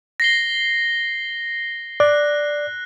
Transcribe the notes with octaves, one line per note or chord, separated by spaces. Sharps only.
A#6 C7 G7
D5 F#6